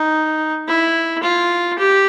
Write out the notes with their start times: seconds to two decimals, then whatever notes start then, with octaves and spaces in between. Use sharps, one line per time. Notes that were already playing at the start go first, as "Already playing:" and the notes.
Already playing: D#4
0.68 E4
1.22 F4
1.78 G4